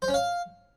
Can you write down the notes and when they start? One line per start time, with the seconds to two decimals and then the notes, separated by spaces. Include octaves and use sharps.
0.02 C5
0.08 C#4
0.14 F5